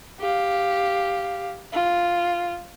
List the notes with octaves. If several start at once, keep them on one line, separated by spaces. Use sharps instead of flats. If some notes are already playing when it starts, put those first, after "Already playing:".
G4 F5
F4